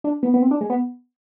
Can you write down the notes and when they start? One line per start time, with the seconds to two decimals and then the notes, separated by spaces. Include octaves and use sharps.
0.04 D4
0.23 B3
0.34 B3
0.42 C4
0.51 D4
0.61 G#3
0.70 B3